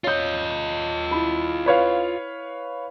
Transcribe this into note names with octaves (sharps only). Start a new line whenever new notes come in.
F4 C#5 D#5 G6
E4 B5
B4 C#5 F5